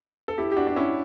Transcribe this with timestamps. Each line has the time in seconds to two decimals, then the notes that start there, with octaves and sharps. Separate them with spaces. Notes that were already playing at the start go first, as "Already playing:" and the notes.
0.28 A4
0.38 E4 G4
0.52 G4
0.56 D4 F#4
0.67 D4
0.76 C#4 E4